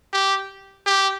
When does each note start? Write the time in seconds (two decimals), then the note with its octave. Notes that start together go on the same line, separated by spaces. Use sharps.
0.13 G4
0.86 G4